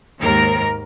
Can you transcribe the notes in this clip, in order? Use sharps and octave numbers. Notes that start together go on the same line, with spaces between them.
D#2 G#2 A#4